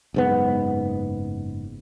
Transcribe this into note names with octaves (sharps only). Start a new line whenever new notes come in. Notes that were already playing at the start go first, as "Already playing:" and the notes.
F#1 G#2 B3